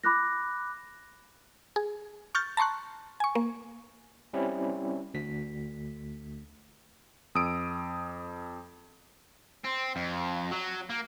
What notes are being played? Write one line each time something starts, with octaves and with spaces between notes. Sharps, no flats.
B5 D6 F#6 A#6
G#4
C#6 F6 G6 A6
A5 A#5 C6 C#6 F#6
G#5 C#6
A#3
G3 C4 C#4 E4
D2 B6
F2 D#6 E6 D7
C4
F2
F#3
A#3